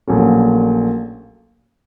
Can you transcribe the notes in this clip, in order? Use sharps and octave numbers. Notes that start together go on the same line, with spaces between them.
A#1 A#2 F#3 A3 C#4